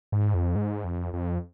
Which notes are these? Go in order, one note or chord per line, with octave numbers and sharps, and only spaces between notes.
G#2
F2
G#2
F2
F2